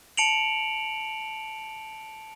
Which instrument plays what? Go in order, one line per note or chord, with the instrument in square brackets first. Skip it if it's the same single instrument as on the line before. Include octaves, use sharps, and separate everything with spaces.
[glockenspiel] A5 C#7 D7 F7 F#7